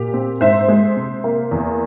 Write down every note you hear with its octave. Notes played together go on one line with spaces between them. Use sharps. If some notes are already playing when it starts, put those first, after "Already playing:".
Already playing: A#2 G4
C4
G#2 C5 E5
G#3
C3
A#3
E2